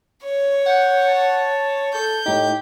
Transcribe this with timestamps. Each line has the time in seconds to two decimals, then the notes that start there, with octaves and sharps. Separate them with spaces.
0.25 C#5
0.66 F#5 G6
1.08 A5
1.94 A4 G6
2.26 A2 D#4 G4